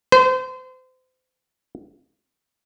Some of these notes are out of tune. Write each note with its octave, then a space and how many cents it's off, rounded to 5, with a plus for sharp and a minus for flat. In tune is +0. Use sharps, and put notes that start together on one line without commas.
C5 -30